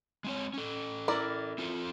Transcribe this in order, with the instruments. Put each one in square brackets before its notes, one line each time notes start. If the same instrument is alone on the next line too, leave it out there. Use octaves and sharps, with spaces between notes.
[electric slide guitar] G#3 C4 C#5
C#4 A4
[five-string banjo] E4 A#4 D5
[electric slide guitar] C4 F4 A4